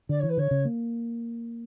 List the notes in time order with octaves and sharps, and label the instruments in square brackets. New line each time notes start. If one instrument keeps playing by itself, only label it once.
[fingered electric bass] D3 [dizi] D5
[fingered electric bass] E3 [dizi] C#5
[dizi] B4
[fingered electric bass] D3 [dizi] C#5
[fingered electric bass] C#3
A#3